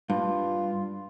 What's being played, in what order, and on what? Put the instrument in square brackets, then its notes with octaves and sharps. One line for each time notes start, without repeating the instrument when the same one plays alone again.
[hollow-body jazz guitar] G2 [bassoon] F4